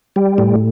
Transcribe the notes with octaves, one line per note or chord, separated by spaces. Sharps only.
G3
A2